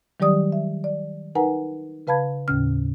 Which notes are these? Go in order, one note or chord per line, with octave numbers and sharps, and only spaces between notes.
D#3 F#3 G3 G4 D5 D#6
E5
D5
D#4 A#4 B4 F#5 G#5 A#5
C#3 B4 F5 A5 B5 G#6
D#2 A2 C#3 C#4 F6